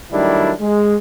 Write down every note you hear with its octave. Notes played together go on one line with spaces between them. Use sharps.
D#3 F#3 G3 A3 D4 E4
G#3